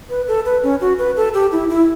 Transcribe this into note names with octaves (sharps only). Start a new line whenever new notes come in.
B4
A4
B4
C#4
F#4
B4
A4
G4
E4
E4